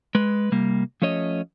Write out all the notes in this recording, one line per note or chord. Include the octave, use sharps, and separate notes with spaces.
G#3 B4
C3 G3 A#3
F3 A3 C#4 C#5 D#5